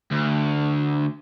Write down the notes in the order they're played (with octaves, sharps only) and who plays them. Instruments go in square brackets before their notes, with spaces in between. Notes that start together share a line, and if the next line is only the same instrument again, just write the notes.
[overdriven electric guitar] D2